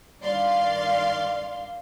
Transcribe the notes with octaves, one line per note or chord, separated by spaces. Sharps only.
G2 D#3 D5 F5 C6